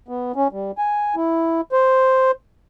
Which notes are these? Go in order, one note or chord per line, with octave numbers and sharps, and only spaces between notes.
B3
C#4
G3
G#5
E4
C5